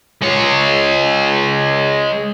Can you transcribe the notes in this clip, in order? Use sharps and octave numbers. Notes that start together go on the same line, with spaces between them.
G#3 C#5